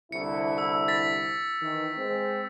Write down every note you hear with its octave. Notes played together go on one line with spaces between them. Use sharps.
C2 D3 E4 C#7
E6
A6 B6
D#3 E3
G#3 C4